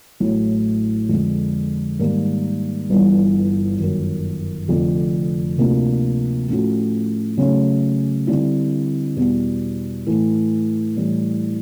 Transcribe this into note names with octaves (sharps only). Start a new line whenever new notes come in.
A1 A2 F#3
F2 D3 F3 G#3
G#2 D#3 G3 A#3
G1 G2 E3
G1 F#2 D#3
F1 F2 D3 F3
D2 C3 F3 A#3 D4
A2 F3 A3 C#4 F#4
C#3 F#3 A3 C#4
D3 G3 C4 E4
E2 B2 G3
A2 E3 A3
A2 E3 G3